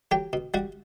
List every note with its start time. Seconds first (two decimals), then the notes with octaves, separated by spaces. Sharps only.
0.11 F#3 G4 G5
0.33 B2
0.54 G3 F#4 F#5